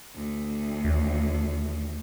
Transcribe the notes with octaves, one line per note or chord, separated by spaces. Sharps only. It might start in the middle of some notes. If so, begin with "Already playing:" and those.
D2
D#2